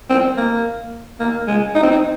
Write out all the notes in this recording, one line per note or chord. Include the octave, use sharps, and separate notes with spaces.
C4
A#3
A#3
G#3
D#4
C4
D#4